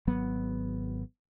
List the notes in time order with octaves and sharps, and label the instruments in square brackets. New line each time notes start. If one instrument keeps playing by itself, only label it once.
[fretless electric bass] G#1 F#3 B3